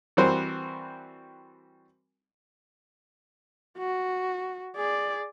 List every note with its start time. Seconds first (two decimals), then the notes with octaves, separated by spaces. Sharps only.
0.17 E3 G3 C4 F#4 A#4 C5
3.78 F#4
4.76 G#4 D5